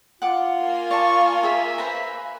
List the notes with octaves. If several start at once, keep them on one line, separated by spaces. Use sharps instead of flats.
F4 F#5 D6
A#3 G#5
D5 A5 C#6
G#4 E5
B4 C5 A#5